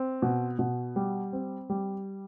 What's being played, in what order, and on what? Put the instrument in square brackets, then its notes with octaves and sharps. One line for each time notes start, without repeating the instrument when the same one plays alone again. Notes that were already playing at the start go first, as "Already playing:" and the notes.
Already playing: [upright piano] C4
B2
B2
G3
C4
G3